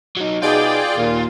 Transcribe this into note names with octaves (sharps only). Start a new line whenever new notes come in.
F#3 D#4
B2 D#4 F4 G#4 D5 G5
D#2 A#2